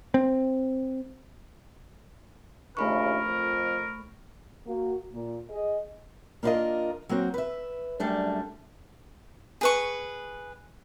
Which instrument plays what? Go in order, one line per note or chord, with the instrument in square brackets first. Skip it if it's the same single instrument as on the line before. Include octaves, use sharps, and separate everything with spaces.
[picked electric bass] C4
[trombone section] A#1 D#2 C#3 [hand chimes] A3 B5 C#6 [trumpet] A#4
[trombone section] F2
[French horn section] A#3 F#4
A#2
G#4 D#5
[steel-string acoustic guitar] A#3 D4 E4 F4 A#4 D#5
F#3 A#3 C4 F#4
B4 E5
F#2 G3 A3 D4
[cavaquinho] G#4 B4 C#6